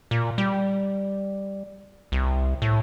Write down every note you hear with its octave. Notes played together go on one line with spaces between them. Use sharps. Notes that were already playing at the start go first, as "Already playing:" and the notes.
A#2
G3
C2
A2